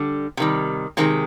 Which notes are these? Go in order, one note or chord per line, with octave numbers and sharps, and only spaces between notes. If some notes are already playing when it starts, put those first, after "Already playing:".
Already playing: D3 G3
C3 D#3 G3
C3 D#3 G#3 C4